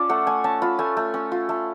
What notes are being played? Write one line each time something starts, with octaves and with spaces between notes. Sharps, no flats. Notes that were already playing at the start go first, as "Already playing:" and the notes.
Already playing: C#4 F4 D5 A5
A3 F#5
A3 G#5
C#4 A5
F4 B5
A3 G#5
A3
C#4
F4
A3